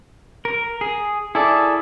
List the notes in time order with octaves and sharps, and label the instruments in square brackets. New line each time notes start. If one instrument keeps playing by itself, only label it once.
[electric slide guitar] A#4
G#4
[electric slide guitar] E4 [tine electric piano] G#4 A4 D5